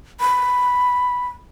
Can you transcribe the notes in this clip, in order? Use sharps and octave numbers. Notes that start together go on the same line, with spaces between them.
B5